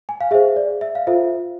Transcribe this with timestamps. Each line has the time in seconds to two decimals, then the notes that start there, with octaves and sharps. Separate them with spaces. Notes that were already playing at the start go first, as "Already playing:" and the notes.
0.09 G#5
0.21 F5
0.31 G#4 E5
0.34 C5
0.56 D5
0.81 E5
0.95 F5
1.07 F4 A4 C5 E5